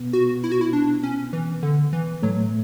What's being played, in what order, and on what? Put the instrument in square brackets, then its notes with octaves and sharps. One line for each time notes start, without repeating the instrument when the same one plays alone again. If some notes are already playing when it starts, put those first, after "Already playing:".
Already playing: [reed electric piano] B2 B3
[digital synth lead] F#4
E4
F#4
E4
D4
C#4
E3
D3
E3
[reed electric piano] A2 A3 [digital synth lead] F#3